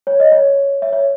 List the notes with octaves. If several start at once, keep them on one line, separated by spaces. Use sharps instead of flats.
C#5
D#5
C#5
C#5 E5
C#5 E5